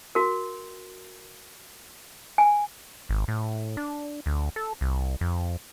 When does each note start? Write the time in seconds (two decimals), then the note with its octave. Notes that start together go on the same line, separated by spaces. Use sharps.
0.15 F#4 A#4
2.38 G#5
3.09 G#1
3.28 A2
3.77 D4
4.26 D2
4.56 A4
4.81 C2
5.21 F2